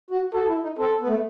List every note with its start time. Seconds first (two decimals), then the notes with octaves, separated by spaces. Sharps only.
0.11 F#4
0.33 F#4 A4
0.48 E4
0.63 D#4
0.78 C4 A4
1.01 B3
1.08 A3